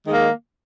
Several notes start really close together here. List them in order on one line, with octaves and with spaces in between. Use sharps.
D#3 G#3 A#3